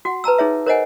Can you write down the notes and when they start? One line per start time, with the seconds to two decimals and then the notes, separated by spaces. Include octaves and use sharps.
0.05 F#4 F#5
0.24 B4 A5 A#5 E6
0.38 D#4 G#4 C#5 E5
0.66 A#4 C5 C#5 D#5 F#5 G#5